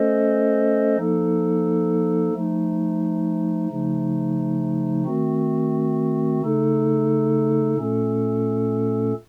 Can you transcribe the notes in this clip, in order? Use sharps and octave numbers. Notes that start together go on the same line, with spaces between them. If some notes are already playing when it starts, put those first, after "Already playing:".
Already playing: A3 C#4 A4 C5 D#5
F3 A#3 D#4 A4
F3 A3 D#4
C#3 F3 A3 D#4
D#3 A3 C4 F#4
C#3 A3 D#4 A4
A#2 A3 C#4 A4